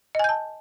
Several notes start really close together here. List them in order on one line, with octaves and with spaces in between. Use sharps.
D#5 G#5 G6 A5